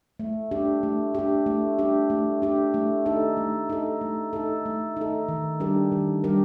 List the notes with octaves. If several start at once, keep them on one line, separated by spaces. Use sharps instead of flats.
A3
D4 G4
A3
D4 G4
A3
D4 G4
A3
D4 G4
A3
D#4 A4
A3
D#4 A4
A3
D#4 A4
A3
D#4 A4
D#3
G3 D4 G4 A#4
D#3
G3 D4 G4 A#4